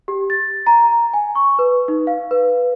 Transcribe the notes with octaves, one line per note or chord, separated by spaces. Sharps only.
G4
A6
A#5
G#5
C#6
B4
D#4
F5
B4